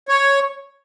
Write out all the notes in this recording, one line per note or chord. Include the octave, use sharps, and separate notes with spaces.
C#5